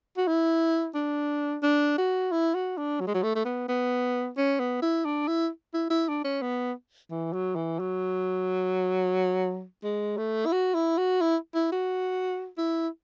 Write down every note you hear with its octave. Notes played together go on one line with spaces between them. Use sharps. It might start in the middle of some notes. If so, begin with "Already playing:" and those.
F#4
E4
D4
D4
F#4
E4
F#4
D4
F#3
G#3
F#3
A3
A3
B3
B3
C#4
B3
E4
D4
E4
E4
E4
D4
C#4
B3
E3
F#3
E3
F#3
G#3
A3
E4
F#4
E4
F#4
E4
E4
F#4
E4